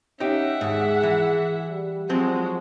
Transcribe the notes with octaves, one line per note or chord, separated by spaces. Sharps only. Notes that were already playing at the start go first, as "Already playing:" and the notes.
C#4 D#4 G4 E5 F#5
D#2 G#2 G#4
E3
G3
F3 F#3 G#3 C4 F#4